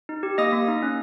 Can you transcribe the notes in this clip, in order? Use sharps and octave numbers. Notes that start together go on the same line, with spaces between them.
D#4
G4
A#3 D#5 D#6
A#3
D#4
C#4